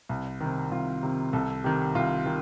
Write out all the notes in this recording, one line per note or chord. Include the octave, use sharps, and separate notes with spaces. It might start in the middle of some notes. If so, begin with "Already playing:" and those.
C2
C3 D#3
C2 F4
C3 D#3
C2 A4
C3 D#3 G4
C2 F4
D#3